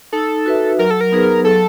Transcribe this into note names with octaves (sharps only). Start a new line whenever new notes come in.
D#4 A4
F#4 B4 E5
F#3 A#4
A4
A#4
B3 D#4 G#4 B4
F#3 A4